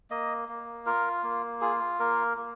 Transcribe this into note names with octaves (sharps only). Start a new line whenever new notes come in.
A#3 D#5
A#3
F4 A#4
A#3
F4 G#4
A#3 A#4
A#3